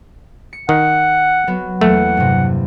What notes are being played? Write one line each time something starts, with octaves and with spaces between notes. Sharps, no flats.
C#7
D#3 F#5
F#3 B3 F#4
E2 F#3 A3 A#3 F#5
G2 C3